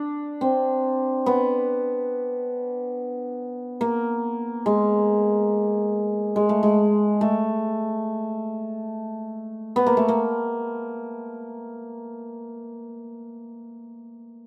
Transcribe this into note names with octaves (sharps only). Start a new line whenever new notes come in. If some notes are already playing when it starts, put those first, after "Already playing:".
Already playing: D4
C4
B3
A#3
G#3
G#3
A3
G#3
A3
B3
A#3
A3
A#3